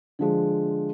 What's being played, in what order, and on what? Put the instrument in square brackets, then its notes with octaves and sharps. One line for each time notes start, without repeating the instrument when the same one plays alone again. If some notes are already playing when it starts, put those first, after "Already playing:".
[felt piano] D3 F3 G#3